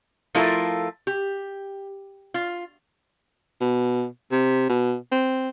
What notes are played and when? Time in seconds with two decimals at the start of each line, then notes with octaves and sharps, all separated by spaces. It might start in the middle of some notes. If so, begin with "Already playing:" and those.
0.35 F3 A3 E4 F4 A4 A#4
1.07 G4
2.34 F4
3.61 B2
4.32 C3
4.69 B2
5.12 C4